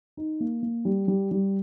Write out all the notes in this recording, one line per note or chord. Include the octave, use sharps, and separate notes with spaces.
D#4
A#3
A#3
G3
G3
G3